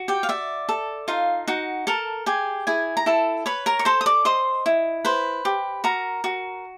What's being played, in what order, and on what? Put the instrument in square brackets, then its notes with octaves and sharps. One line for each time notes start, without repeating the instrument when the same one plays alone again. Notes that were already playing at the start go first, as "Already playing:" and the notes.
Already playing: [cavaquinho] F#4
G4 G5
F5
D5 E5
A4
D#4 F4 F5
D#4 F#4 F#5
A4 A#4 A5
G4 G#4 G#5
E4 G#4 G#5
A#5
E4 A4 A5
B4 C#5 B5
A#4 A#5
C#6
A4 C5 C6
D#6
D5 D6
C5 D#5 C6
E4
B4 C5 B5
G4
F#4 A#4 A#5
F#4